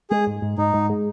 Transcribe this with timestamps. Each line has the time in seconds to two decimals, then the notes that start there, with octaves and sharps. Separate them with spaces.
0.10 G#3 G#4
0.27 G#2
0.42 G#2
0.58 G#2 D#4
0.74 G#2
0.90 G#3